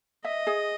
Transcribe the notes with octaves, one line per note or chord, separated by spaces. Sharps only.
D#5 E5
G#4